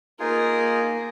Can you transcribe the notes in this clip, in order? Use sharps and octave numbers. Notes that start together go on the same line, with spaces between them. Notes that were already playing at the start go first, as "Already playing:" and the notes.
A#3 D#4 F4 G#4 A#4